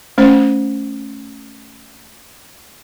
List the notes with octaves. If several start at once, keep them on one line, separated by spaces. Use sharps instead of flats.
A3 C#4 C5